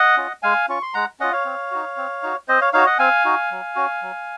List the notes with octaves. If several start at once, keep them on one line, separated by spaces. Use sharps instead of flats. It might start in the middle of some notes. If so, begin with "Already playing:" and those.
Already playing: D#5 F#5
C#4 F4
G#3 F5 G#5
C#4 F4 C#6
C6
G#3 F#5 A#5
C#4 F4 D#5 F#5
C#5 F5
C4
D#4 F#4
C4
D#4 F#4
C4 C5 D#5
C#5 F5
D#4 F#4 C#5 F5
D#5 F#5
C4 F5 G#5
D#4 F#4
F#3
C#4 F#4
F#3